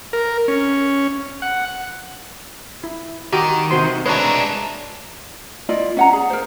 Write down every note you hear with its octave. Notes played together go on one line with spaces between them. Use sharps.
A#4
C#4
F#5
E4
D#3 F#4 G4 D6
C3 F#4 C5 C6
G#3 D4 B4 C#5 E5 G#5 A#5
E4 F4 D5 D#5
C#4 F#5 A#5
G#4
A#4 C5